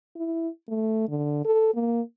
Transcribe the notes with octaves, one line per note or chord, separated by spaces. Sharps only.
E4
A3
D3
A4
A#3